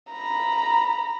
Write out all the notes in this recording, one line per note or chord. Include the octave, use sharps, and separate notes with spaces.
A#5 B5